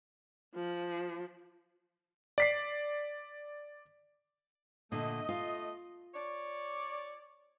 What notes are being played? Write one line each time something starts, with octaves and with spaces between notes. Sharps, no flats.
F3
D5 B6 C7
A#2 D3 A3 D#5
F4
C#5 D5